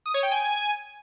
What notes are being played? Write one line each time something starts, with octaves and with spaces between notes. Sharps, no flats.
D#6
C#5
G5
G#5